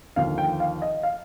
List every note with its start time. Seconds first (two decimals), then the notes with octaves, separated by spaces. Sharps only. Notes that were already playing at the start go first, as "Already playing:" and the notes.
0.16 D#2 D3 F3 F5
0.38 G5
0.60 F5
0.82 D#5
1.03 F5